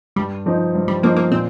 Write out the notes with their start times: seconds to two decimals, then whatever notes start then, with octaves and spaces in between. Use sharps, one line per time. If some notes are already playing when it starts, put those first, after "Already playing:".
0.16 G2 G3
0.46 F3 C4 D#4
0.75 G2
0.88 G3
1.03 F3 A#3 C4 D#4
1.17 A#3
1.32 A#2 C4